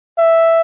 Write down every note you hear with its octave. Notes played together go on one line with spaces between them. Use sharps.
E5